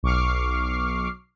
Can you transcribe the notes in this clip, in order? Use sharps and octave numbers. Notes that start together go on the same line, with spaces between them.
B1 C#6 D6 F6 C7